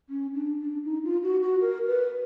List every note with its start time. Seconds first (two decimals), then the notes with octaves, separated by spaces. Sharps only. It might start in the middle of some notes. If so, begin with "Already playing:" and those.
0.09 C#4
0.34 D4
0.60 D4
0.85 D#4
1.04 F4
1.23 F#4
1.42 F#4
1.61 A#4
1.87 B4